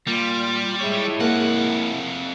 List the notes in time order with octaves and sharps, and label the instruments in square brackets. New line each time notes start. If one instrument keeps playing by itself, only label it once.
[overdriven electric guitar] A#2 [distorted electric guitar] G3 [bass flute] F4
[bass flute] G#3 [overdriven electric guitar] E4 C#5
[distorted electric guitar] F2 F#5 [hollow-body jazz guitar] A#3